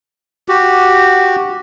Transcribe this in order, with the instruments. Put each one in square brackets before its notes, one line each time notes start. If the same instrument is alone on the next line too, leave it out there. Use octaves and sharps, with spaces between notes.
[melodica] F#4 G4